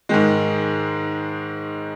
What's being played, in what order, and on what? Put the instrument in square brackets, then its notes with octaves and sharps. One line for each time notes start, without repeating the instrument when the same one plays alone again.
[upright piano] G#2 D#3 G#3